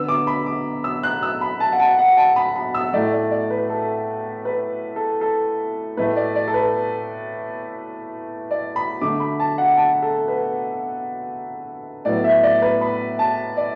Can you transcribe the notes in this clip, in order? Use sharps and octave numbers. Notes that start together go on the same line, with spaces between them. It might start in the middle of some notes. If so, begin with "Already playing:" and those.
Already playing: D3 B3 E6
D6
B5
D6
E6
F#6
E6
B5
A5
F#5
A5
F#5
A5
B5
B5
E6
A2 A3 D5
D5
D5
B4
A4
B4
A4
A4
A2 A3 B4
D5
D5
A4
B4
D5
B5
D3 A3 D6
B5
A5
F#5
A5
A4
B4
A2 F#3 B3 D5
E5
D5
B4
B5
A5
D5